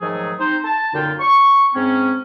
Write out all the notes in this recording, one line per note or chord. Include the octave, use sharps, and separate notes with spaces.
G#2 D#3 F3 F#3 A3 G#4
C4 D#4 C5
A5
F#2 A#2 D3 D#4 F4 G5
C#6
G#2 C4 C#4